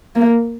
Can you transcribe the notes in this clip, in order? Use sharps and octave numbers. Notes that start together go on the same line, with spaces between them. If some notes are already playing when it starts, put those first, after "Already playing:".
A#3